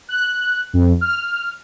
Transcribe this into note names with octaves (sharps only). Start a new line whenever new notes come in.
F#6
F2
F6